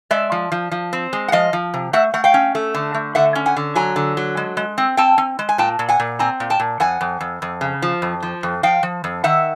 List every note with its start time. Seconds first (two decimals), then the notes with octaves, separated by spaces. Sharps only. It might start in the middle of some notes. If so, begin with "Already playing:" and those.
0.11 G#3 D5 E5
0.32 F3
0.52 F3
0.71 F3
0.93 C4
1.13 G#3
1.28 F#5
1.32 F3 D#5 F5
1.53 F3
1.74 C3
1.93 A3 E5 F#5
2.14 A3 F#5
2.24 F5 G5
2.34 C#4
2.55 A3
2.74 D3
2.94 A3
3.15 D3 E5 F#5
3.35 C#4
3.46 F#5 G#5
3.57 D3
3.75 F#3 G#5 A#5
3.96 D3
4.17 F#3
4.37 G#3
4.57 G#3
4.78 C4
4.97 C4 G5 A5
5.18 C4
5.39 G#3
5.49 G#5
5.58 A#2 G5 A5
5.79 A#2
5.89 F#5 G#5
6.00 A#2
6.19 C4 G#5 A#5
6.40 A#2
6.50 G5 A5
6.60 A#2
6.80 F2 F#5 G#5
7.01 F2
7.21 F2
7.42 F2
7.61 C#3
7.82 F3
8.02 F2
8.23 F3
8.43 F2
8.63 F3 F5 G5
8.83 F3
9.04 F2
9.24 D#3 E5 F#5